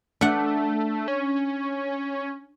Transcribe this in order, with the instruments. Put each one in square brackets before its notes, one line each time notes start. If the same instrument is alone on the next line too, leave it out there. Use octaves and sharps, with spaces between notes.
[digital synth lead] A3 [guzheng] D4 F#5
[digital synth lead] C#4